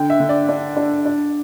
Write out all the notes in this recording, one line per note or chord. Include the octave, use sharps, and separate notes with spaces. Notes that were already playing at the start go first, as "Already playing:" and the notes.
Already playing: D3 G5
E5
D3
D5
D4
D4
D4